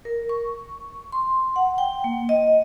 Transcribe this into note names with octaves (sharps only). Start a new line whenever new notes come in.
A#4
C#6
C6
F#5
G5
A#3
D#5